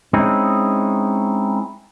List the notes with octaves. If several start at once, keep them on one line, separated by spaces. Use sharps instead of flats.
G#3 C4 C#4 D#4 E4